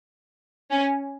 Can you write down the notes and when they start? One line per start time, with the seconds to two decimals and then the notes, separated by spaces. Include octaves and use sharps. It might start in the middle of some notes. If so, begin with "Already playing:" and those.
0.70 C#4